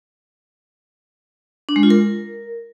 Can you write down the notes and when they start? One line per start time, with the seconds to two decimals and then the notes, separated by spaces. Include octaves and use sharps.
1.69 D4
1.76 G#3
1.83 F4
1.90 A#4